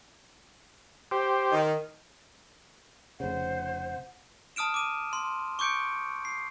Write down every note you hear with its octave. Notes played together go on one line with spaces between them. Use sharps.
G4 C5
D#3
F1 C#3 C5 F#5
A5 D#6 F6 D7 E7
D6 D#7
C6
C#6 D6 G6 C#7 D7
C7